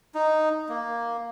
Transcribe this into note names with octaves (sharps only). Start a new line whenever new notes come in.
D#4
A#3